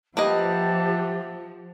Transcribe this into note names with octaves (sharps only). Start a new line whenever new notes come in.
F3 A#3 G4 B4 D#5 E5 F#5 A5